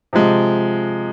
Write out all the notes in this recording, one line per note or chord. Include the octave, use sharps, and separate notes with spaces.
C3 F3 G#3